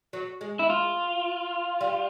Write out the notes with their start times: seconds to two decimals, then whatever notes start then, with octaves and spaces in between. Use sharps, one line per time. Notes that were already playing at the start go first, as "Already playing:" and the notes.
0.13 F#3
0.41 G#3
0.59 E4
0.70 F4
1.81 G3